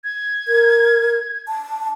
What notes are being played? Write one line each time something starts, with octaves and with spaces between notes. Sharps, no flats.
G#6
A#4
A5